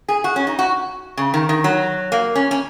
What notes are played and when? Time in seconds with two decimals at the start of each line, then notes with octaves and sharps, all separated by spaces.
0.08 G#4
0.24 F#4
0.36 C#4
0.47 D#4
0.59 F#4
1.17 C#3
1.34 D#3
1.49 D#3
1.64 F#3
2.12 A#3
2.35 C#4
2.51 C#4